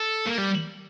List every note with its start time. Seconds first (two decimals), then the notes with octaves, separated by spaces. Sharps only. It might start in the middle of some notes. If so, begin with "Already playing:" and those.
Already playing: A4
0.26 A#3
0.38 G3